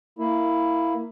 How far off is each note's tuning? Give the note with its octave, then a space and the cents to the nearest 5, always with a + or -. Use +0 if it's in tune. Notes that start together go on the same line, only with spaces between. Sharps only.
A#3 -10 E4 +0